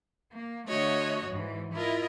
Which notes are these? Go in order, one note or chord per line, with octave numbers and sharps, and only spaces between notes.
A#3
D3 A3 F#4 C#5 D#5
G#2 E3
E4 F4 A#4 D#5